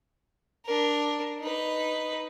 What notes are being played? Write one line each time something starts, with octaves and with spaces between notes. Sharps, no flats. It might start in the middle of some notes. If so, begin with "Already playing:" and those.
D4 A#4
D#4 B4